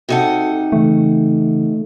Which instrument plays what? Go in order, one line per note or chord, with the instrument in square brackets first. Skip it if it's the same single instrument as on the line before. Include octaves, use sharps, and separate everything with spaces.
[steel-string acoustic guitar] C3 D#4 F#5 [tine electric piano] F#4 A4 A5
[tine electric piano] C#3 E3 [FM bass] A3